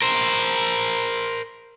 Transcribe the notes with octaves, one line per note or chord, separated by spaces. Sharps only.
A#4 C5